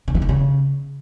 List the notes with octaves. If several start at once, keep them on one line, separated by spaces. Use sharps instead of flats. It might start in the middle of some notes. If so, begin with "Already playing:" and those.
D3
E3
D#3
C#3